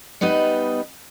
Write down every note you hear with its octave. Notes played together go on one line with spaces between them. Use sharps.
G3 B3 D#4 B4 D#5